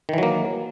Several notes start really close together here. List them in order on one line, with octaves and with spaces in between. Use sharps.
D#3 E3 F#3 A#3